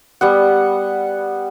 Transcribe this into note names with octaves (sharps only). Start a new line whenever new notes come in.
G3 B3 F#5